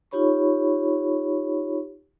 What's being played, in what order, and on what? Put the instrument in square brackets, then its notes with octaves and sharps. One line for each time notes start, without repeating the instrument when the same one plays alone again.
[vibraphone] D#4 F4 G4 C#5 B5 C#6